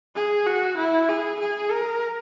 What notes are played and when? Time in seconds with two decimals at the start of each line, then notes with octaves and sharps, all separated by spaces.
0.16 G#4
0.46 F#4
0.77 E4
1.09 G#4
1.40 G#4
1.71 A#4